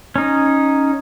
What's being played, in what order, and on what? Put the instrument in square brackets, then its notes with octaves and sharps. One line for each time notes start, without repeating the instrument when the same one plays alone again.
[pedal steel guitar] C#4 D#4